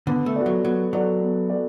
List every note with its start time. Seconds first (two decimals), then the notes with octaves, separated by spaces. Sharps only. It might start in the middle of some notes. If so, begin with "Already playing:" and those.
0.07 D3 B3
0.26 A3
0.36 F#4 A4 D5
0.46 F#3
0.65 F#3 B3
0.93 F#3 F#4 A4 D5
1.21 B3
1.50 F#4 A4 D5